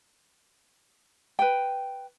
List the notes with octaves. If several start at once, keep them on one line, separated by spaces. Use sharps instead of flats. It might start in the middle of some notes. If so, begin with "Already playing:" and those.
B4 G5